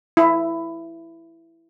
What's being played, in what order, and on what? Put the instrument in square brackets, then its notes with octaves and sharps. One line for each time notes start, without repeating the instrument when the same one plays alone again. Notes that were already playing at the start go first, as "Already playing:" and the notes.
[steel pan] E4